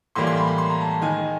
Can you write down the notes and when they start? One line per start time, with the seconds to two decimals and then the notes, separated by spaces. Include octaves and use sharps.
0.15 A2 E3 G3 A#3 C6
0.27 C6
0.37 B5
0.48 B5
0.58 C6
0.70 A#5
0.81 A5
0.91 A5
1.01 D#3 G#3 G#5